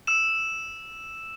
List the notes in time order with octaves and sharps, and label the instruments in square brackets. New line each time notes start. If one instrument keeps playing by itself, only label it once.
[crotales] E6 E7